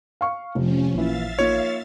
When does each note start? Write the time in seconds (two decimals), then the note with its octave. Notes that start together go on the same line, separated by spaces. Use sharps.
0.21 F5 C#6
0.55 F1 C3 F3 C#4
0.94 A1 A#2 E3 E5 F5 A6
1.39 A#3 D#4 F4 C#5